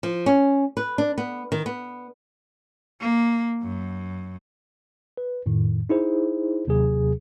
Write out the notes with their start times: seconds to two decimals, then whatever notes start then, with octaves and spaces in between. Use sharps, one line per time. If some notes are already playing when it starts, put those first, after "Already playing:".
0.03 F3
0.26 C#4
0.77 B4
0.98 D4
1.18 B3
1.52 D#3
1.66 B3
3.00 A#3
3.62 F#2
5.17 B4
5.46 F2 A2 D#3
5.89 D#4 E4 G#4 C5
6.67 D#2 C3 F#3 G#4